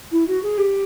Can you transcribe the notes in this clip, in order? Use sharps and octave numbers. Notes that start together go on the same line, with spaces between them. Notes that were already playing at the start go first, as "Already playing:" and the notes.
E4
F#4
G#4
G4